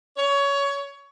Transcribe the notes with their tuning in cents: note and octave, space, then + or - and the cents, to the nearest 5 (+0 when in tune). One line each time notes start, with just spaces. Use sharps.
C#5 +20